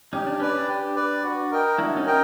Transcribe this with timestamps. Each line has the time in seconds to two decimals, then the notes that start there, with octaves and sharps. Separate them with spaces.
0.13 C#4 D#4 G4
0.26 D4
0.40 C#4 B4 D5
0.54 D4
0.68 G4
0.95 B4 D5
1.23 F#4
1.51 A#4 D#5 G5
1.78 D4 E4 F#4
1.97 C#4 D#4
2.06 A#4 D#5 G5